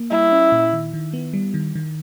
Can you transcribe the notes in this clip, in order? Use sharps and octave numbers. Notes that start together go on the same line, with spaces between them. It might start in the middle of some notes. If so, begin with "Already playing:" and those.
Already playing: A#3
G3 E4
C#4
A#2
D#3
D#3
B3
G3
D#3
D#3